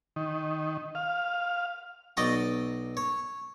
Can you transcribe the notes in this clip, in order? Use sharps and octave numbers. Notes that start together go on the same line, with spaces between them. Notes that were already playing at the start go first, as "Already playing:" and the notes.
D#3
F5
B1 D5 D#5 G5 A#5 C#6
C#5